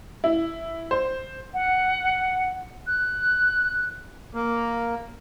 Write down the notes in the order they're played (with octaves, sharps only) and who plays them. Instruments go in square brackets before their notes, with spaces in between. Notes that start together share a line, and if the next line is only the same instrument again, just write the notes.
[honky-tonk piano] E4
C5
[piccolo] F#5
F#6
[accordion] A#3